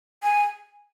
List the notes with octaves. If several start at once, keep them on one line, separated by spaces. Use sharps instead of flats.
G#5